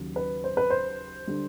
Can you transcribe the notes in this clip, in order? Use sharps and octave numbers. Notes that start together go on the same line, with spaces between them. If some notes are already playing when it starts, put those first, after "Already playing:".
Already playing: D#2 C#3 F#3
B4
C5
B4
C5
D3 G3